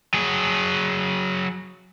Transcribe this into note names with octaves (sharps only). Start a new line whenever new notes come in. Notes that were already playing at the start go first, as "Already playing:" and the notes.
F#3 G#4